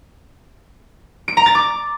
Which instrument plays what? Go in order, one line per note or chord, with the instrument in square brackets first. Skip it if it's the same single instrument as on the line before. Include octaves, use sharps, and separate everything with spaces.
[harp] D7
A#5
A6
D6